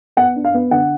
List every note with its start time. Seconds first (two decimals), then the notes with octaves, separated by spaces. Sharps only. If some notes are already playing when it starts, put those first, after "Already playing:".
0.17 B3 F#5
0.36 D4
0.45 F5
0.54 B3
0.71 D3 F#5